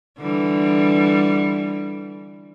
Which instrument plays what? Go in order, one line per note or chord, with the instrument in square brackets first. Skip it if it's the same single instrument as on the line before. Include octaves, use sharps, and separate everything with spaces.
[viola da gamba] D3 E3 G3